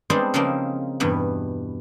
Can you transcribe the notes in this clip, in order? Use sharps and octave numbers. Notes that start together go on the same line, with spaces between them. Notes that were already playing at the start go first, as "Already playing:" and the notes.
G3 G#3 B3 C4 D4 C5
C#3 F3 G#3 A#3 C4 D#4
E2 G2 B2 B3